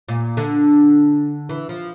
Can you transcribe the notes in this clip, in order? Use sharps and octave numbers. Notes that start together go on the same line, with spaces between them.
A#2
D3
E3
F3